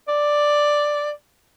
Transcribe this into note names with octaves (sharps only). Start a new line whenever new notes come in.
D5